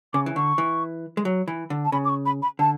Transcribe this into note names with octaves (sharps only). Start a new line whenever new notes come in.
C#3 D6
E3
D3 C#6
E3
G#3
F#3
E3
D3
A5
C#3 B5
D6
C#6
B5
B5
D3 A5